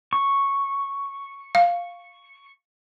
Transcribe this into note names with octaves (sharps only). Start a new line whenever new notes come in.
C#6
F5